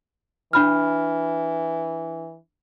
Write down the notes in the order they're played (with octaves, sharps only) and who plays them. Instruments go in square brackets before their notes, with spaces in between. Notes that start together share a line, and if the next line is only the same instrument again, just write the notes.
[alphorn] E3 [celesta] D4 B5 F6